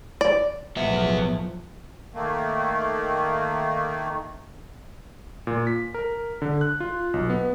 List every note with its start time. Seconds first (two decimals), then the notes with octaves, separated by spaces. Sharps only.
0.21 D5
0.77 B1 A2 F3 B3 E5
2.14 D#3 A3 A#3
5.47 A#2
5.67 B6
5.94 A#4
6.42 D3
6.61 F#6
6.80 F4
7.14 B1
7.30 B3